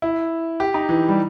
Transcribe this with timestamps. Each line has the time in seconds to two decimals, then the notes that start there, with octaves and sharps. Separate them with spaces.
0.02 E4
0.60 G4
0.74 D#4
0.89 E3
1.08 G3